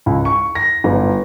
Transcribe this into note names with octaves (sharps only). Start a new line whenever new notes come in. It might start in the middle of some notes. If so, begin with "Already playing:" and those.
C#2
C#6
A#6
G1